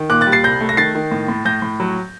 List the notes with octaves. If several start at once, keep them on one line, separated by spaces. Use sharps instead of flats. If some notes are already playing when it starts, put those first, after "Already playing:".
Already playing: D#3
A#2 D6 F#6
F#6 A6
G3
A6 C7
C2 G6 A#6
A3
A#6
D#3 A6 C7
D#3
A2
A2
A2 G6 A#6
A2
F#3